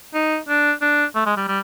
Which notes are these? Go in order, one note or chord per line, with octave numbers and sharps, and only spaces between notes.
D#4
D4
D4
A3
G#3
G3
G3